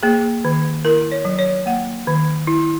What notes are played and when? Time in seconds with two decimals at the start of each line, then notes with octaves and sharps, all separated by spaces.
0.03 A#3 G#4
0.45 D#3
0.85 E4 A#4
1.12 C#5
1.25 F#3
1.39 C#5
1.66 A#3 F#5
2.07 D#3
2.47 E4